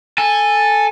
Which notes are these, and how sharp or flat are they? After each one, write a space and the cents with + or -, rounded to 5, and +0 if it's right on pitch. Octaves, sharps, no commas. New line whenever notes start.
A4 +0 G#5 -10